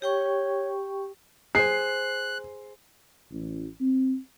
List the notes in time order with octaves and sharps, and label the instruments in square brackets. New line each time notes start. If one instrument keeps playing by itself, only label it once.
[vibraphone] G4 G5 C#6 [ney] C#5
[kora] G#4 C5 [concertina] F#6 [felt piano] C7
[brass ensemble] A1
C4